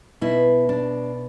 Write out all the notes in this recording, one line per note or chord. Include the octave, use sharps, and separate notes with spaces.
B2 E4
D4